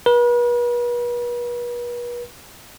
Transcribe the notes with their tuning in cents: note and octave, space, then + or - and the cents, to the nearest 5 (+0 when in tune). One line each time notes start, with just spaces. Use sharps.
B4 -40